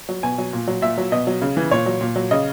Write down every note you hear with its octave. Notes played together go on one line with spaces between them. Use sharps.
F#3
B2 G#5
F#3
A#2
F#3
A#2 E5
F#3
B2 D#5
F#3
C#3
E3
A#2 C#5
F#3
A#2
F#3
C#3 D#5